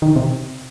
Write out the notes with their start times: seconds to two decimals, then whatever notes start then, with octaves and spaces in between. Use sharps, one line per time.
0.02 D#3
0.16 C3